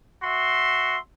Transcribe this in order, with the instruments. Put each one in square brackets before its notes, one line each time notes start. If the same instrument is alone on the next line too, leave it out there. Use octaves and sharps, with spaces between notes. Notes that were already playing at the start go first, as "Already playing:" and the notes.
[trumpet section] F#4 E5 C6